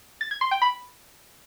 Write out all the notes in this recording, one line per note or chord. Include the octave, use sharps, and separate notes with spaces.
A6
G#6
C6
G5
B5